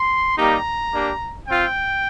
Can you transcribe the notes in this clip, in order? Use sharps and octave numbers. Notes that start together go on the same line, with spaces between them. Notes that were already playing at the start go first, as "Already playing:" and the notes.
Already playing: C6
G3 A#3 D#4 G4 A#5
A#3 D4 G4
C4 F4 G5